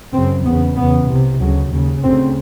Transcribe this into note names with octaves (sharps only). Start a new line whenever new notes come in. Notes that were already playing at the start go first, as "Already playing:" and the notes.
F#2 C#3 C4
E2 C#3 B3
E2 C#3 B3
C2 C3
D2 C#3 F#3
D#2 C#3
D2 C#3 C4